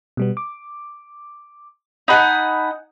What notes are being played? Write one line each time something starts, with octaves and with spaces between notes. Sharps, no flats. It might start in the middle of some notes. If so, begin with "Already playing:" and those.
B2 G3 B3
D6
D#4 F#5 G#5 A5 B5 D#6